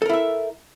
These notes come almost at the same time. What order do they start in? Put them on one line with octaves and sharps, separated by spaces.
A4 A#4 E4 E5